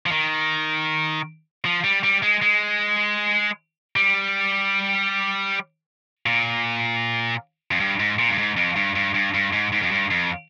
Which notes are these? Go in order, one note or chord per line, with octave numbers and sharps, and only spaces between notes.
F3
D#3
F3
G3
G3
G#3
G#3
G3
A#2
F2
G2
G#2
A#2
G2
G#2
F2
G2
G2
G2
G2
G#2
G#2
F2
G2
F2